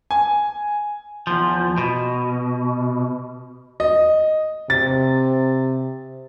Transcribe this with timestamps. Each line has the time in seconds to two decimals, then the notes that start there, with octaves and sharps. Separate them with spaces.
0.11 G#5
1.27 E2 F3
1.78 B2
3.80 D#5
4.70 C3 A6